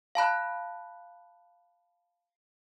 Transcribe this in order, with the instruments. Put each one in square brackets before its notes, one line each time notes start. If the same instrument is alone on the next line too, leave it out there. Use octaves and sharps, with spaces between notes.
[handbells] F5 A5 B5 F#6